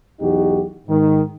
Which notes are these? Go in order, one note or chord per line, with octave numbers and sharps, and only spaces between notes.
B1 E2 D#4 F#4 G4
G#2 D#3